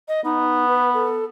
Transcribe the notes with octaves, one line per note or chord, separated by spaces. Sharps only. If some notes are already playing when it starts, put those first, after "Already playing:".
D#5
B3 D#4
B4
A4